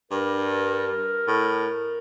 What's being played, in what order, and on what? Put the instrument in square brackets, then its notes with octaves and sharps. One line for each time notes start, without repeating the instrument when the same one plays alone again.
[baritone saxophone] G2 [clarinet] A#4
[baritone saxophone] A2